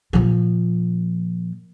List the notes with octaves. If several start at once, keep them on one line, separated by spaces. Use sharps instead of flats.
A#2 F3